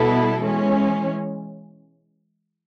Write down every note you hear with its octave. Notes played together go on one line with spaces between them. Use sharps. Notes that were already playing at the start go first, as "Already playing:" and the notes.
Already playing: B2 G3 B3 E4 A4
E3 G#3 C#4